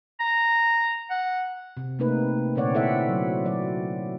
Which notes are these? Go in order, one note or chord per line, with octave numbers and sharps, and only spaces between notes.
A#5
F#5
C3
C3 A3 A#3 C4 D#4 B4
A#2 D3 C4 C#5 D5 F#5
E4 A4 C5 E5 F#5
F#3
F#3 D5